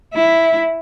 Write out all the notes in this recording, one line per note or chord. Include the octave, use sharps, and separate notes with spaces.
E4